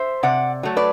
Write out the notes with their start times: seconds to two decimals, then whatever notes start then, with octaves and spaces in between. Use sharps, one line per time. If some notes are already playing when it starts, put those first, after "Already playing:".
Already playing: C5 E5
0.23 C3 D5 F#5
0.63 F#3 A3
0.77 B4 D5